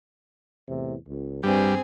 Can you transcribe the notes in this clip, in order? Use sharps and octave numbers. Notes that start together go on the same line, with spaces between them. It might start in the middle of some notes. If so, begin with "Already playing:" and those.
E2 A2 C3
C#2
G2 G3 C4 G#4